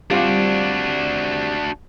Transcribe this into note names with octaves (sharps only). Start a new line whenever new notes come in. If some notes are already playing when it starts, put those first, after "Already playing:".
G3 C4 D4 F4 F#4